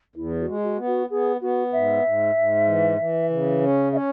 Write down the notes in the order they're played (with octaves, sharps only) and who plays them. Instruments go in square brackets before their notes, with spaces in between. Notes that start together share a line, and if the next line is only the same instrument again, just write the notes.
[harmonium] E2 [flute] E4
[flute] F#4
[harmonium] G#3
[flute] F#4
[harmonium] B3
[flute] F#4
[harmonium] B3 [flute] G#4
[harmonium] B3 [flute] F#4
[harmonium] G#2 [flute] E5
[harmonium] G#2
G#2
E3
E3
C#3
C#4
[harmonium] C#4 [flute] E5
[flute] C#5